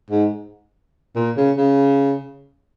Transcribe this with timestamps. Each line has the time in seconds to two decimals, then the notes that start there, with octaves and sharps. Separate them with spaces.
0.10 G#2
1.16 A#2
1.37 C#3
1.57 C#3